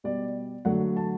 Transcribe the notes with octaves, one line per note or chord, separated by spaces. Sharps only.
B2 G3 D5
D3 F#3 A3 F#5
A5